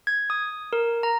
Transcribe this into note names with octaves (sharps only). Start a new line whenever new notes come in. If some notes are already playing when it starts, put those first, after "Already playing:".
G#6
D#6
A#4
A#5